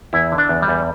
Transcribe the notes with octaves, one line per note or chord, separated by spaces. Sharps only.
E2 E4
D3
D4
E2
G3
E2